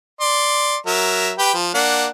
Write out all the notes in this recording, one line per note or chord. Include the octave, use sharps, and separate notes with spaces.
D5 C6
F#3 A#4 E5
G4 B4 G5
F3
A#3 D4 F#5